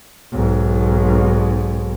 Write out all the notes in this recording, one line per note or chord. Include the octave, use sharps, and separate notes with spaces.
B1 G#2